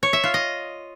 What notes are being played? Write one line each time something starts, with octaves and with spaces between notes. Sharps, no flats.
C#5
E5
F4
D#5